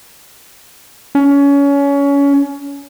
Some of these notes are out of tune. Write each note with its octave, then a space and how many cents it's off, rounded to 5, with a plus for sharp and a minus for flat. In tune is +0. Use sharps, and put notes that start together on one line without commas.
C#4 +25